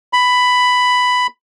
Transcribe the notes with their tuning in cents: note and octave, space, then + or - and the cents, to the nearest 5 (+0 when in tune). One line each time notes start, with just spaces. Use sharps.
B5 +10